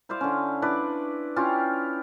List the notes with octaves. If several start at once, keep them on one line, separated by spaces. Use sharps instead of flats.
E4 C5 D5 F5
D3 C#4
D4 E4 B4 D5
C#4 E4 F4 G4